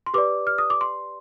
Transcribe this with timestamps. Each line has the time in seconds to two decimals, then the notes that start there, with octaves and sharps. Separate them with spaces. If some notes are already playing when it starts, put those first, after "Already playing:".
0.06 C6
0.14 G4 B4 D5 D6
0.47 F6
0.58 D#6
0.70 D6
0.81 C6